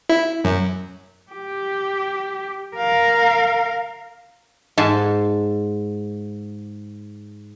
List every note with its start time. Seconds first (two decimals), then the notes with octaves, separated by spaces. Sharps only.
0.09 E4
0.44 F#2
1.32 G4
2.76 A#4 F5
4.78 G#2 G#5 A5